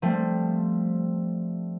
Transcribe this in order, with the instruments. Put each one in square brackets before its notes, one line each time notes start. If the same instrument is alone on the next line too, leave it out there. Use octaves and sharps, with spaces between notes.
[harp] F3 G3 A3 C4